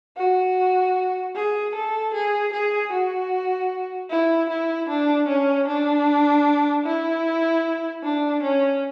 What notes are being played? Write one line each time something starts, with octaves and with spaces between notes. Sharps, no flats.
F#4
G#4
A4
G#4
G#4
F#4
E4
E4
D4
C#4
D4
E4
D4
C#4